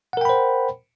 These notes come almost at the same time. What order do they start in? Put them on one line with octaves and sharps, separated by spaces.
F#5 A#4 G5 B5 C5